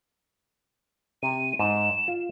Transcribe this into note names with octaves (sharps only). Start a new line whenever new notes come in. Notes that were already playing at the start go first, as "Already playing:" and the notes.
C3 D#7
G#2 E7
F4